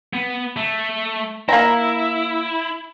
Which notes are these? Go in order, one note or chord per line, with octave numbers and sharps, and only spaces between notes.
B3
A3
A#3 E4 A#5